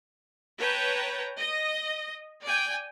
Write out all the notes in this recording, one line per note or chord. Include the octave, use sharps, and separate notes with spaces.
B4 C#5 G5 A5 A#5
D#5
D5 G5 G#5